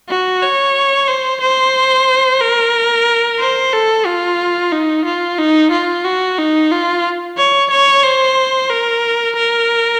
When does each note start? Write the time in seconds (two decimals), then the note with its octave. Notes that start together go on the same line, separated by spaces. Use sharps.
0.09 F#4
0.42 C#5
1.08 C5
1.41 C5
2.41 A#4
3.40 C5
3.73 A4
4.06 F4
4.73 D#4
5.05 F4
5.39 D#4
5.72 F4
6.05 F#4
6.38 D#4
6.71 F4
7.38 C#5
7.71 C#5
8.04 C5
8.70 A#4
9.36 A#4